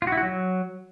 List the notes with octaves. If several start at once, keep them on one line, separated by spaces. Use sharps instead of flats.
F4
F#4
E4
F#4
F#3